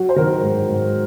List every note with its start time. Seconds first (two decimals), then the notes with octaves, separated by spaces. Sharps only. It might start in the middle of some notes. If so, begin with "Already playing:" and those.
Already playing: F#3 F#4
0.09 C5
0.16 D#3 A#4
0.42 G#2
0.69 G#2